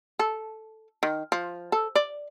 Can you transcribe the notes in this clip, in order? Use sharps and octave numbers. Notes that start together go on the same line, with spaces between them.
A4
D#3
F3
A4
D5